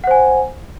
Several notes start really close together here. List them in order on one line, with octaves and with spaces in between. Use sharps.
F#5 C5 G#5